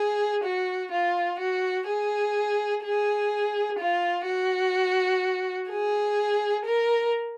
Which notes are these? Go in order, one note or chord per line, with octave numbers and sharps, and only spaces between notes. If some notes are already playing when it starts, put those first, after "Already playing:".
Already playing: G#4
F#4
F4
F#4
G#4
G#4
F4
F#4
G#4
A#4